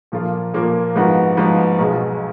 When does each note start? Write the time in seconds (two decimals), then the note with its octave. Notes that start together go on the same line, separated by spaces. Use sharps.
0.12 A#2 F3 A#3 F4
0.54 A#2 F3 A#3 F4
0.95 G#2 F3 B3 F#4
1.37 G#2 F3 B3 F#4
1.79 B1 B2 G#3